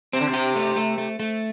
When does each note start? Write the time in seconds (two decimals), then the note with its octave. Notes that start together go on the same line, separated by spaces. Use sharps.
0.13 C3 C4
0.20 D3
0.29 C3 G4
0.56 A3
0.76 A3
0.98 A3
1.20 A3